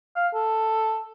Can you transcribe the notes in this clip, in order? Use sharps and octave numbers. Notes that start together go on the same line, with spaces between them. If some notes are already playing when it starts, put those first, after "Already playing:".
F5
A4